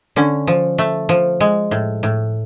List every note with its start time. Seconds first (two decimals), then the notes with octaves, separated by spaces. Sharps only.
0.16 D3 C#4
0.47 F3
0.78 A3
1.09 F3
1.40 G#3
1.71 A2
2.03 A2